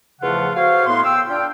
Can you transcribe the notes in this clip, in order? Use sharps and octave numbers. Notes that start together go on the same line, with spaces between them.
E2 C#3 F3 A3 F4 F#5
F#4 A4 C5 C#5 F5
A2 B3 C6
F5 G5 E6
D4 F4 G5